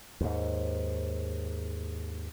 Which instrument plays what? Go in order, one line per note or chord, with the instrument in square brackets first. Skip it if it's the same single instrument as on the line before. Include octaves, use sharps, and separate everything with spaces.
[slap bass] D#2 G#2